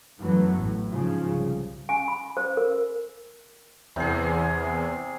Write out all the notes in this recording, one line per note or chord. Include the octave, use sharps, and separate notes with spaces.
F#2 E3 F#3 A3 B3
A1 A2
G#2 C#3 F3
C2
G#5
B5
C5
A#4
E2 C3 G#4